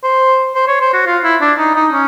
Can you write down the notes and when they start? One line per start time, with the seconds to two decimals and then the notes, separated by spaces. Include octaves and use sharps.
0.03 C5
0.55 C5
0.68 C#5
0.81 C5
0.93 F#4
1.06 F4
1.24 E4
1.41 D4
1.58 D#4
1.75 D#4
1.92 C#4